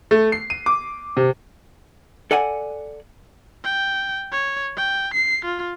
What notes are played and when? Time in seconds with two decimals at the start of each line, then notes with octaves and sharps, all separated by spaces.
0.11 A3
0.32 C7
0.50 D#7
0.66 D6
1.17 C3
2.31 A4 D5 F#5 G#5
3.64 G5
4.32 C#5
4.77 G5
5.14 C7
5.45 F4